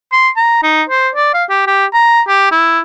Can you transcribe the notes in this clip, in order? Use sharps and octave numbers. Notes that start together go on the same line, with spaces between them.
C6
A#5
D#4
C5
D5
F5
G4
G4
A#5
G4
E4